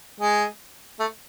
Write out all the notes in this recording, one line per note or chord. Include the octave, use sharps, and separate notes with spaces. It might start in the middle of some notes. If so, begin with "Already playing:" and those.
G#3
A3